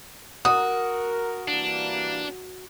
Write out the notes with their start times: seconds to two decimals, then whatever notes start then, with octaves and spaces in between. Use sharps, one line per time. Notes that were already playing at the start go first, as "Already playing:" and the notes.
0.45 F#4 A#4 D#6
1.48 E3 G3 A#3 D4